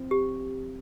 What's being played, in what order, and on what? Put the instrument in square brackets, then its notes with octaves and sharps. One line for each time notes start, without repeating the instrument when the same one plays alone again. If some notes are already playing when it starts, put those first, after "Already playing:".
Already playing: [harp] F3 C4 F4
[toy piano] G4